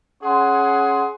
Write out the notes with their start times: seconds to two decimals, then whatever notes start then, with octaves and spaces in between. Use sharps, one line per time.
0.23 C#4 G#4 F#5 G#5 C6